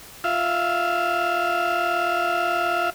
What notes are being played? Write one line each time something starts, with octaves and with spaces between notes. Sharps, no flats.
F4 E5 F5